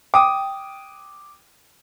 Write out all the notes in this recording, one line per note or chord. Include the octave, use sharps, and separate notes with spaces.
G5 D6 D#6